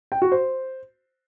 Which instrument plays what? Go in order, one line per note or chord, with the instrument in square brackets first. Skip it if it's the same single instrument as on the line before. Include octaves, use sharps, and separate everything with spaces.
[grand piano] G5
F#4
C5